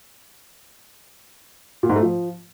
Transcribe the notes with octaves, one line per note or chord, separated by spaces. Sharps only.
A#2
G#2
A3
F3